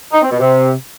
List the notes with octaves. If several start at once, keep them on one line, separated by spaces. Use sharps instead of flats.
D#4
C4
B2
C3